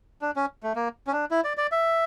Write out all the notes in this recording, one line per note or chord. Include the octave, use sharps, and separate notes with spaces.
D4
C#4
A3
A#3
C#4
D4
E4
D5
D5
E5